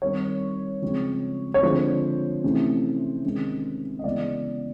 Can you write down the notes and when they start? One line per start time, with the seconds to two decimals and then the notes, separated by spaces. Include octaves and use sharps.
0.02 D#3 G3 C4 C#5
0.82 C#3 F3 G#3 C4
1.54 C#5
1.62 D3 F3 G#3 C4 C5
2.44 C3 E3 A3 C#4
3.24 C3 D#3 G#3 C#4
3.99 D#5
4.04 C#3 E3 G#3 B3 D5